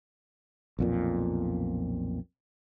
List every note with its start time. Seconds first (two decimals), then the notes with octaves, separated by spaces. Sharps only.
0.79 B1 F2 A#2